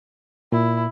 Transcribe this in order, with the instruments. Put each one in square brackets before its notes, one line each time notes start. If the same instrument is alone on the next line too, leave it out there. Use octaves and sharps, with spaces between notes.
[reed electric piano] A#2 [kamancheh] E4